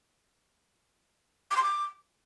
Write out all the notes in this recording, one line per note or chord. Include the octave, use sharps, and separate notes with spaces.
D6
C6
D6